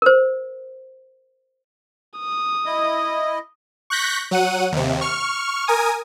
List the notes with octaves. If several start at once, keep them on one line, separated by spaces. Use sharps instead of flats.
A#4 C5
D#6
E4 D#5
C#6 F#6 G6 A#6 B6
F#3 F#5 D#7
D#2 C3
C#6 F6
A#4 G#5 D#6